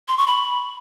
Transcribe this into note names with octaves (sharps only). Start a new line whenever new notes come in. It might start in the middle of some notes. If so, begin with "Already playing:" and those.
C6
C#6
B5